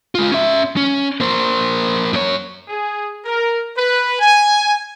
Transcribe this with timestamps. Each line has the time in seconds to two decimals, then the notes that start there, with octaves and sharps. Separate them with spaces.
0.15 G#3 F4
0.32 C#4 E5
0.77 C#4
1.20 A#3 C5
2.13 F#2 C#5
2.67 G#4
3.24 A#4
3.75 B4
4.19 G#5